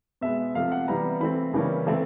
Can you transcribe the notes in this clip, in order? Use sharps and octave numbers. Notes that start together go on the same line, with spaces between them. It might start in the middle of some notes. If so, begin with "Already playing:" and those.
B2 G#3 B3 E5
C3 F3 A3 F5
F#5
C3 E3 G3 B3 A#5
E3 A3 C4 B5
C#3 E3 G3 A#3 C#4
C3 E3 A3 C4